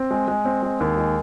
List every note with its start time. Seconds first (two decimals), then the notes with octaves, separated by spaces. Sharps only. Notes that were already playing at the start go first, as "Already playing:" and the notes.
Already playing: C4
0.11 G#3
0.28 G#3
0.45 C4
0.62 G#3
0.80 D#2
0.97 G#3